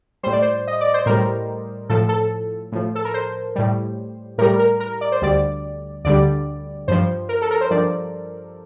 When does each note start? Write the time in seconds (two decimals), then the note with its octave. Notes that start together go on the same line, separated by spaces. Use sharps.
0.23 A2 G3 C5
0.33 D5
0.42 C5
0.67 D#5
0.81 D5
0.94 C5
1.06 A2 G3 A#4
1.89 A2 F3 A4
2.09 A4
2.72 A2 F3
2.95 A4
3.05 A#4
3.14 C5
3.55 A2 G3
4.38 A2 G3 A#4
4.59 A#4
4.80 A#4
5.01 D5
5.12 C5
5.22 D2 D3 G3 D5
6.05 D2 D3 G3 D5
6.88 G2 F3 C5
7.29 A#4
7.42 A4
7.51 A#4
7.61 C5
7.70 G2 F3 D5